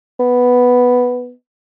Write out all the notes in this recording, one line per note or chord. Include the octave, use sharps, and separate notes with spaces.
B3